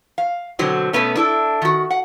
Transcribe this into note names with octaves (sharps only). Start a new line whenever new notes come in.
F5
B2 D3 F#3 C4 F#4
B2 A3 B3 C#4
D4 E4 A4
D#3 F#4
F#5